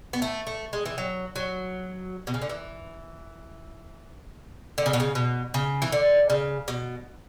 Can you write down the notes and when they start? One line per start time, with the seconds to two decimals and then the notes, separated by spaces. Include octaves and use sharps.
0.13 B3
0.22 A3
0.47 A3
0.73 G#3
0.86 E3
0.98 F#3
1.36 F#3
2.27 B2
2.34 C#3
2.42 D3
2.49 E3
4.78 D3
4.86 C#3
4.93 B2
5.00 C#3
5.15 B2
5.54 C#3
5.82 E3
5.92 D3
6.30 C#3
6.68 B2